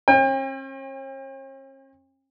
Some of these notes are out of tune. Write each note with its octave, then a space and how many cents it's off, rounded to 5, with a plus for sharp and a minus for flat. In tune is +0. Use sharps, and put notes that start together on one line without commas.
C#4 -45 G5 +40